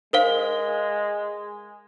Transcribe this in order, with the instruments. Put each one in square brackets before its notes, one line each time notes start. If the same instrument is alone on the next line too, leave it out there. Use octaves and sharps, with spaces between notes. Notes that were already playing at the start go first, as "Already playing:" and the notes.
[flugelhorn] G#3 [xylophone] A#4 C5 F5